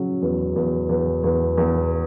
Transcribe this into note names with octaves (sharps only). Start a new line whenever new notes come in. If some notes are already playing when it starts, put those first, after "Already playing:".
Already playing: C#3 F#3
E2
E2
E2
E2
E2